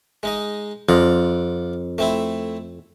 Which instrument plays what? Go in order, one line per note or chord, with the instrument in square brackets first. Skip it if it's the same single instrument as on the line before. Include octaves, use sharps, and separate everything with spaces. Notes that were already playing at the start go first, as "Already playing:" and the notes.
[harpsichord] G#3 D#4 D#5
[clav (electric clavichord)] F2 [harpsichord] F4 D5 F#5
[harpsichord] A3 C4 E4